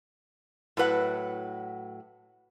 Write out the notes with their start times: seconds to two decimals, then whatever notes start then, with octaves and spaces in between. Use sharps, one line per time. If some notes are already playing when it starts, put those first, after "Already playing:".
0.77 A2 F#3 B4 F#5